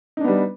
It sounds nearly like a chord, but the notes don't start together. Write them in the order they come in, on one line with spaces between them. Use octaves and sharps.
D#4 D4 B3 G3